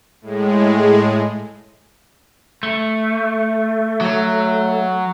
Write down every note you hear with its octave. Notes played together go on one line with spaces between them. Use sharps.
A2 G#3
A3
F#3